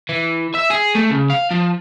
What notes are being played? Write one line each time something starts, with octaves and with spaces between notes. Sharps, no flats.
E3
E5
G#4
A3
C#3
F5
F3